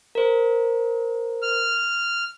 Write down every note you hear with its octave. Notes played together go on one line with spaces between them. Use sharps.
A#4 C5
F6